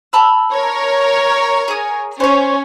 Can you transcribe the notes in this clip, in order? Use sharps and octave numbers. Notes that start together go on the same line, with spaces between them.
A5 B5 E6
A#4 C#5
G#4 D#6
C#4 C5 C#5